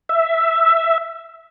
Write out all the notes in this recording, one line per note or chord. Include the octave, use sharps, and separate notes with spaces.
E5